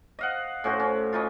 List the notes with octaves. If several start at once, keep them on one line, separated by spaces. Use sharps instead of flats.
D#5 F5 F#5
A2 C#4 F#4 C5
C#4
C#4 D#4 F4